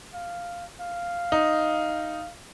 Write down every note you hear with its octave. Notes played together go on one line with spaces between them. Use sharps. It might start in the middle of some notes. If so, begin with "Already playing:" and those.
F5
F5
D#4